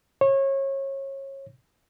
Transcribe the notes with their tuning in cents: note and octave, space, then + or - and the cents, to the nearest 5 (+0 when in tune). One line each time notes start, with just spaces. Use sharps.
C#5 -25